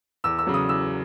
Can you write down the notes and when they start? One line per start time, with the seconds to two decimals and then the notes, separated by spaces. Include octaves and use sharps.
0.24 E2 E6
0.39 E6
0.47 C#3 F#3
0.54 D#6
0.69 E2 E6